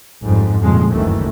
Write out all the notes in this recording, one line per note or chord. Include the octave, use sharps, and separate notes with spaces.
A1 F2 G#2 G3
A1 F2 A#2 C#3 F3 G#3
F#1 D2 G2 D#3 E3 A3